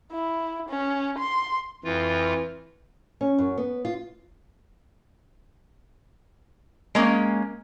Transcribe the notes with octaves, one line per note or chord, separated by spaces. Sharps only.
E4
C#4
C6
F2 E3 F4
C#4
F#2
B3
F4
G#3 A#3 C#4